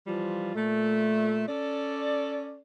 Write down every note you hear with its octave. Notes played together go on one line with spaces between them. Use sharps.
E3 F3 G3 F4
A#2 A3
C#4 A4 D5